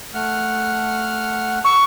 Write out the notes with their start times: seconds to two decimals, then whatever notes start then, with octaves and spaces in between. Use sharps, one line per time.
0.14 A3 F#5 F6
1.64 C#6 E6